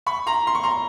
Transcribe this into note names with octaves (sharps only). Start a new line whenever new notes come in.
B5 C#6
A#5 C6
C6
C#6
A#5 C6